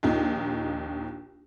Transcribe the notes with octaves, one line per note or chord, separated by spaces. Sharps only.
A#1 D#2 D#4 F4